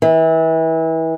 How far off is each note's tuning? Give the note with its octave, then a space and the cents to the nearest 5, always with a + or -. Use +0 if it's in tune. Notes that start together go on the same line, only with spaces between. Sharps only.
E3 -30